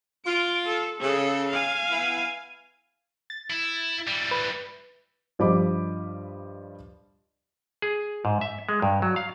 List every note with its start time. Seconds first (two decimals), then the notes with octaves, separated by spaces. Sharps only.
0.25 F4 D7
0.66 A4
1.01 C#3 A4
1.49 F5 G#5
1.90 B3 E4
3.30 A6
3.50 E4
4.07 E3 G3 A6
4.31 B4
5.39 G2 F3 G3 D#5 B5 D6
7.82 G#4
8.25 G#2
8.41 E5
8.69 G#3
8.82 G2
9.02 F#3
9.16 F5